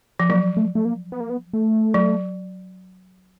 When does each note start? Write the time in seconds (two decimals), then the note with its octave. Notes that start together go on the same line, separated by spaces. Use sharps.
0.20 F3
0.29 F#3 A#3
0.57 A3
0.75 A3
0.85 A#3
1.12 B3
1.20 A#3
1.30 B3
1.53 A3
1.94 F#3